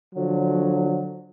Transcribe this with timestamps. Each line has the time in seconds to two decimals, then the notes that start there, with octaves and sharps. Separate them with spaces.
0.15 D3 F3 F#3